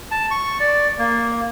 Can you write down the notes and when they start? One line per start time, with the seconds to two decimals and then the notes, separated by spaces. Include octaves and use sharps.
0.11 A5
0.31 C#6
0.60 D5
0.99 A#3